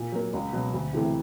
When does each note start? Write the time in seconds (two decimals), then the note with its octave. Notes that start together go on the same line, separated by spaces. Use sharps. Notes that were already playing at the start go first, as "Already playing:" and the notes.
Already playing: A#2
0.12 F#3 A#3
0.33 C#2
0.53 B2 F#3
0.73 D2
0.93 C3 E3 A3 C4